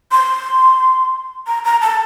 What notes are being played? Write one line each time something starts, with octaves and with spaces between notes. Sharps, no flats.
C6
A#5
A#5
A5